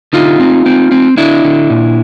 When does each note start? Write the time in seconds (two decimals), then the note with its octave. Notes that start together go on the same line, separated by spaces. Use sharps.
0.13 D3 D#4 F4
0.39 C4
0.66 C4
0.92 C4
1.17 D3 D4 E4
1.44 D3
1.70 A#2